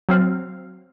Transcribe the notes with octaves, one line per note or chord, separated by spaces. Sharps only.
F#3 C4 F5